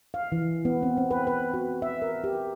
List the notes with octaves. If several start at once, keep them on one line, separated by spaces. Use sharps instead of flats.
F5
E3
B3
C4
C4
B4
B4
F#4
E5
A#4
G4